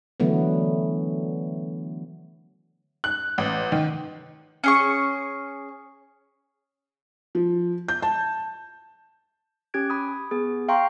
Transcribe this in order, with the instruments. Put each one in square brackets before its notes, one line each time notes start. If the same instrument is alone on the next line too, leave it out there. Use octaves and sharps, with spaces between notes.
[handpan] D3 E3 F#3 A3 B3
[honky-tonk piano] F#6
A1
D#3
[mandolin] C#4 G#4 C#6
[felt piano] F3
G6
A5
[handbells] C#4 G4 F#6 G#6 D7
B5 D#6
B3 G#4
F5 G5 A#5 C6 C#6